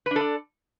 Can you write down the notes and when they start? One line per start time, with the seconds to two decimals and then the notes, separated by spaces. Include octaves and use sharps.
0.06 B4
0.11 D4
0.16 A4
0.21 D5